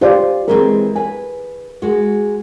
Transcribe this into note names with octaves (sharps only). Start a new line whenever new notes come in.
F4 G4 C5 D5
E3 G#3 C4 A#4
B4 G#5
G#3 F#4